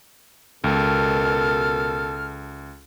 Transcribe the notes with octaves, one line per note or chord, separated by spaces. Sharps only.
C#2 B2 A4 A#4 F6